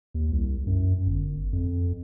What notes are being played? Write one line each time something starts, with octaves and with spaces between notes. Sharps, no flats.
D#2
C2
F#2
G1
F2